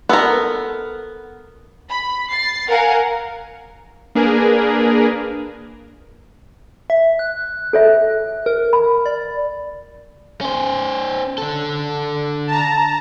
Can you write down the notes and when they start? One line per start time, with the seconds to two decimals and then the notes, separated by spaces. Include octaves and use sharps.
0.09 B3 A4 A#4 B5
1.89 B5
2.31 A6 C7
2.69 A#4 F5 F#5 G#5
4.15 A#3 D4 G#4 A#4 B4
6.90 E5
7.19 F#6
7.73 A4 C#5 E5
8.46 A#4
8.73 B5
9.06 D5
10.41 C#4 C5
11.38 D3 A4
12.47 A5 A#5